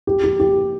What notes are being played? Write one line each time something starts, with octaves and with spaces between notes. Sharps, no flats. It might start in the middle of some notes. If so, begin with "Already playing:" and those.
G4
G4
G4